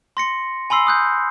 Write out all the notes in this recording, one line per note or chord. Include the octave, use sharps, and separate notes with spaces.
C6 A#6 C#7
G#5 B5 C6 E6 C7
D#6 F#6 G6